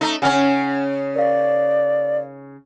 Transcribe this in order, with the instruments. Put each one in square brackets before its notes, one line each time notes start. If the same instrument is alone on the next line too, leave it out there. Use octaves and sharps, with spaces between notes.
[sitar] A3 D#4
[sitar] C#3 C#4 [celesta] F#5 G#5 F6
[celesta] A#4 F5 [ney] D5